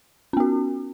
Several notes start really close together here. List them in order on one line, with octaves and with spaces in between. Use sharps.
C#4 B3 F#4